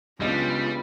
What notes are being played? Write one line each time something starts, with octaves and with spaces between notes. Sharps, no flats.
C#2 G3 B3 C#4 D4 F4 G#4 D#5